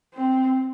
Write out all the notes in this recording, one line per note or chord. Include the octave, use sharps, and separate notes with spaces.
C4